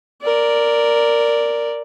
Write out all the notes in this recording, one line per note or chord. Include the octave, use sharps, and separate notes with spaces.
A#4 D5